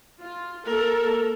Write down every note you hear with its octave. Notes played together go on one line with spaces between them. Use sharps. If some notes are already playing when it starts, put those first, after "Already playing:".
F4
A#3 A4 A#4